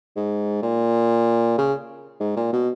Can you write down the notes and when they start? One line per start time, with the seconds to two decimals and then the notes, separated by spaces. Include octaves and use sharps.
0.16 G#2
0.63 A#2
1.58 C#3
2.20 G#2
2.36 A#2
2.53 B2